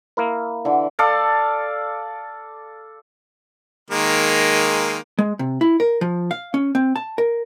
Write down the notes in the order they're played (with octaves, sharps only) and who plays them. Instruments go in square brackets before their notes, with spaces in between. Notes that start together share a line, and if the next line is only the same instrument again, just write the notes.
[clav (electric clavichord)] A#3 E4 A#4
[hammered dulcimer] D3 E3
A4 D5 F5
[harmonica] D#3 G#3 A#3
[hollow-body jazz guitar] G#3
C3
E4
A#4
F3
F5
C#4
C4
A5
A#4